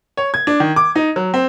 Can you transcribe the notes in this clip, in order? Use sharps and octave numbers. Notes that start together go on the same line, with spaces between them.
C#5
G#6
D4
D#3
D6
D#4
F#3
C4